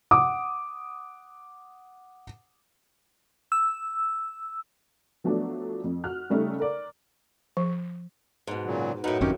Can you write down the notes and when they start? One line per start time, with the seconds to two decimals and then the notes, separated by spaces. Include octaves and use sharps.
0.11 F#5 D6 D#6
3.52 E6
5.24 F3 F#3 A3 B3 D4
5.84 F2
6.04 F#4 F6 F#6
6.30 C#3 G3 A3 D#4
6.60 A#4 D5
7.57 F3
8.47 G#2 B2
8.65 A#2 C#3 F#3
9.04 F#2 A2 D#4 B4 F#5
9.21 G1 F2 C#4 D#4 G4 A#4